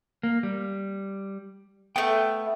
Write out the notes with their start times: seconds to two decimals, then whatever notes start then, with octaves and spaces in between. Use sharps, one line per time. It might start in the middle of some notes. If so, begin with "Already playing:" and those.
0.23 A#3
0.43 G3
1.96 A3 B3 G5